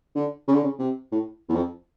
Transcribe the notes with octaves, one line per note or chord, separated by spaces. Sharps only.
D3
C#3
D3
C#3
C3
A2
E2
F2